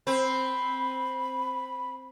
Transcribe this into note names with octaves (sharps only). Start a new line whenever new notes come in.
C4 B5